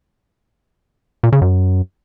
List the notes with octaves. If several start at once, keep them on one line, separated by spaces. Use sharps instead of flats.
A#2
C#3
F#2